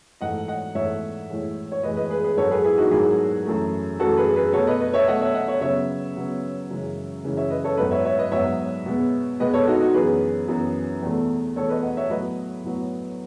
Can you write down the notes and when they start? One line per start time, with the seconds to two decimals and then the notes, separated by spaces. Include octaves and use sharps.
0.21 G#2 E3 A3 D#5 F#5
0.48 D#5 F#5
0.75 G#2 E3 A3 C#5 E5
1.29 A2 E3 G#3
1.72 C#5
1.83 A2 E3 G#3 B4 D#5
1.96 B4 D#5
2.10 G#4 B4
2.24 G#4 B4
2.37 G#2 D#3 F#3 A4 C#5
2.51 G#4 B4
2.64 E4 G#4
2.78 D#4 F#4
2.91 G#2 D#3 F#3 E4 G#4
3.45 F#2 E3 A3
4.00 F#2 E3 A3 F#4 A4
4.17 G#4 B4
4.36 G#4 B4
4.53 B2 A3 A4 C#5
4.67 B4 D#5
4.80 B4 D#5
4.94 C#5 E5
5.08 B2 A3 D#5 F#5
5.21 C#5 E5
5.34 D#5 F#5
5.48 C#5 E5
5.61 C#3 F#3 B3 C#5 E5
6.16 C#3 F#3 B3
6.70 F#2 C#3 E3 G#3
7.24 F#2 C#3 E3 G#3
7.37 C#5 E5
7.50 B4 D#5
7.64 A4 C#5
7.77 G#2 F#3 B3 B4 D#5
7.91 C#5 E5
8.05 C#5 E5
8.19 B4 D#5
8.31 G#2 F#3 B3 C#5 E5
8.86 B2 G#3 B3
9.40 B2 G#3 B3 B4 D#5
9.54 A4 C#5
9.67 D#4 F#4
9.80 D#4 F#4
9.94 F#2 E3 B3 G#4 B4
10.48 F#2 E3 B3
11.02 E2 B2 A3
11.56 E2 B2 A3 A4 C#5
11.69 B4 D#5
11.83 D#5 F#5
11.97 C#5 E5
12.10 A2 F#3 B3 B4 D#5
12.64 A2 F#3 B3